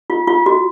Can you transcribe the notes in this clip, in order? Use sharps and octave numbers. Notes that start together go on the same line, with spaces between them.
F4
F4
F#4